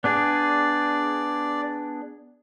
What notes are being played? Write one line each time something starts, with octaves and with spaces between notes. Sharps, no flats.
B3 D4 G#4 D5